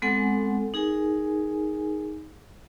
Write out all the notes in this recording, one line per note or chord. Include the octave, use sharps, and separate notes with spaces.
G#3 B3 C4 A4 F#5 G#5
D#4 G#4 A#4 G#5